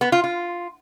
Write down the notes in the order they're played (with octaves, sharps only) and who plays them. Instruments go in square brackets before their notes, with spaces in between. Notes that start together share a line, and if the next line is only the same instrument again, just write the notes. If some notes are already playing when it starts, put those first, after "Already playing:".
[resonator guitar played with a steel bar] B3
F4
F4